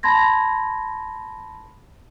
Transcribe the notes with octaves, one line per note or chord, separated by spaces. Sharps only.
A5 B5 C6 G#6 A#6